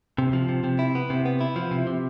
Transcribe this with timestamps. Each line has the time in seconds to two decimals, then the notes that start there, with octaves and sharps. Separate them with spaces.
0.18 C3
0.33 F3
0.49 C3
0.64 C3
0.79 E4
0.95 B3
1.10 C3
1.25 B3
1.41 E4
1.56 F3
1.71 C3
1.87 C3